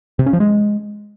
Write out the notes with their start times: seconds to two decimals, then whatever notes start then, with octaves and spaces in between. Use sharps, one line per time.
0.19 C3
0.26 C#4
0.33 F3
0.40 G#3